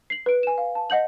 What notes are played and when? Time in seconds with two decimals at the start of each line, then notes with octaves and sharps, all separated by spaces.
0.10 C7 F#7
0.26 B4 D7
0.43 G#5 E7
0.58 F5
0.75 A5
0.90 D#5 F#5 G6 F#7